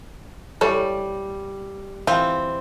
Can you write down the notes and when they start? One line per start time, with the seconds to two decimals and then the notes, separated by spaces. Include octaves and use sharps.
0.61 E3 G3 A4 C#5
2.07 E3 C4 F4